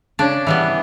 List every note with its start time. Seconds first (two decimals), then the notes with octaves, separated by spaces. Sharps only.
0.19 C#3 D4
0.47 E3 G3 B3